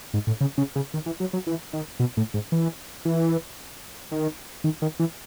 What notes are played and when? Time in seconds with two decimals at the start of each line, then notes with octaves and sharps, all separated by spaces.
0.14 G#2
0.27 A2
0.41 C#3
0.58 C#3
0.76 C#3
0.94 D#3
1.06 E3
1.20 F#3
1.33 F#3
1.47 E3
1.73 D#3
2.00 B2
2.17 A2
2.34 G#2
2.52 E3
3.05 E3
4.12 D#3
4.64 D#3
4.82 D#3
4.99 E3